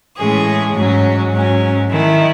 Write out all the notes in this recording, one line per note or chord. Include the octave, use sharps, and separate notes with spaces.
A2 E3 G#3 C#4 G#4
G#2 F#3 C#4
G#2 F#3 C#4
D#3 A3 E4